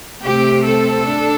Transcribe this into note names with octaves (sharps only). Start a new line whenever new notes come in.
C3 A3 C4 G4
A4
D4